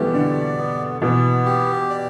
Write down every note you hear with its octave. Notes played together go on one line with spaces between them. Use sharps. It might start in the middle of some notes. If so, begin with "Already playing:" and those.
Already playing: B2 E3 G3 A3 B3 G4
D3 D5
B3
B2 E3 B3
G4
D5